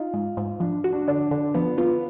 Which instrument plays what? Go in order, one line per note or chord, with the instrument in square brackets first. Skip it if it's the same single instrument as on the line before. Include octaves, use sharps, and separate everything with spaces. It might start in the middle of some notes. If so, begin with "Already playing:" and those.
Already playing: [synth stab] D#4 [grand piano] F4
[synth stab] G#2
G#2
[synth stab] F3 [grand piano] D4
[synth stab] F#4
[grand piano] D4
[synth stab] D3 [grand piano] D4
[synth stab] D3 [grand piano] D4
[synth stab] F3 [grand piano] B3
[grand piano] B3 [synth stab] F4